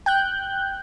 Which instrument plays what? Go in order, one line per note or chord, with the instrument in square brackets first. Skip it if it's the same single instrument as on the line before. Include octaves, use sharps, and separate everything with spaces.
[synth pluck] G5 F#6 G6